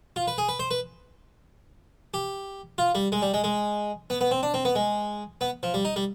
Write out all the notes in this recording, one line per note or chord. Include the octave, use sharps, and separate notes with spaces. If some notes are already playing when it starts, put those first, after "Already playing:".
F4
B4
G#4
B4
C5
B4
G4
F4
G3
G#3
G3
G#3
G#3
B3
B3
C4
D4
C4
B3
G#3
B3
F3
G3
D#4
G3